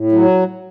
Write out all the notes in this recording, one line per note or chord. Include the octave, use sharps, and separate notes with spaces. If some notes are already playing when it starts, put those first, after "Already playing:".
Already playing: A2
F#3